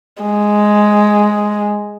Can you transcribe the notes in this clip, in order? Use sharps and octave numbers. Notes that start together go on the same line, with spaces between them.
G#3